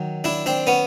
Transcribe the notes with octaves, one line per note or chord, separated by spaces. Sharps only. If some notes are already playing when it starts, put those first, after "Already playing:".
Already playing: D#3 F#3
D4 E4
C4 D4
B3 C#4